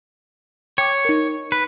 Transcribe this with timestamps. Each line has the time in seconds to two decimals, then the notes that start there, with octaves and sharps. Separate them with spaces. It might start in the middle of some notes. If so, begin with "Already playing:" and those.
0.78 C#5 G5 D6
1.05 D#4 A#4
1.52 B4